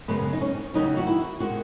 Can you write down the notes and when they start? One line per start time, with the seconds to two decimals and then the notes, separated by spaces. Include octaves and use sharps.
0.08 F#2 C#3 G#3 B3
0.33 D#4
0.41 C#4
0.74 D#2 C#3 F#3 D#4
0.97 F#4
1.07 E4
1.40 D#3 G#3 F#4